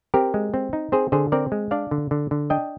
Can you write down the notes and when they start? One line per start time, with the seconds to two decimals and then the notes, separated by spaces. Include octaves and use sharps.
0.14 C4 G4 A#4
0.34 G#3
0.54 C4
0.73 D#4
0.92 C4 G#4 C5
1.12 D3 G#4 C5
1.32 C4 A#4 D5
1.52 G#3
1.71 D4 D5 F5
1.91 D3
2.11 D3
2.31 D3
2.50 D4 D#5 G5